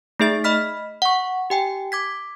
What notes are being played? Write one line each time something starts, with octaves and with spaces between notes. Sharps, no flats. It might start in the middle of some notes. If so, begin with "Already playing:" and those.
A3 D#4 G#4 E5 A6
D#5 B5 F6 B6
F#5 C#6
G4 G5 G#5
D6 G#6 B6